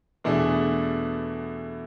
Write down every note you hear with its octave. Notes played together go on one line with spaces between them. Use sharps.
E2 B2 A3 D4 G#4